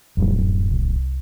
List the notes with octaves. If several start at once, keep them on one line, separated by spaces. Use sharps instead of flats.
D1 F2 G3
F#2
C2